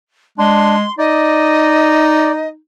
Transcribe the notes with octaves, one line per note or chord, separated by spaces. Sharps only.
G#3 D4 C6
D#4 D5 D#5